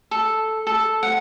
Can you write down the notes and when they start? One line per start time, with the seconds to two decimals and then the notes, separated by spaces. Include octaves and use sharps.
0.11 A4
0.67 A4
1.03 F#5